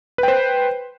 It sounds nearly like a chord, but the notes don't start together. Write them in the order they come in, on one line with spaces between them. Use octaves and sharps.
B4 G5 C5